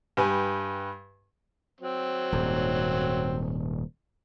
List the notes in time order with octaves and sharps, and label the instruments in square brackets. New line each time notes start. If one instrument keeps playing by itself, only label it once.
[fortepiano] G2 G4 B4 G#5
[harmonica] F#3 C4
[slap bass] D#1 G#2